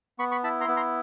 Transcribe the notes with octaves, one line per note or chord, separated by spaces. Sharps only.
B3 B5 C#6
B5 C#6
E4 A5 B5
A#5 C6
B3
A#5 C6